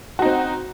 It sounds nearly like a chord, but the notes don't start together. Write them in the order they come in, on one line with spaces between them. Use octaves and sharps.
F#4 D#4 C4